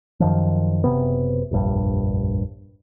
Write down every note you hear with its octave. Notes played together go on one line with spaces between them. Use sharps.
F#2 D#3 F3
F#1 C3 B3
F1 A#1 G2